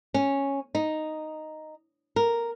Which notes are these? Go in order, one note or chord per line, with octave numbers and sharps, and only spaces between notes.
C#4
D#4
A#4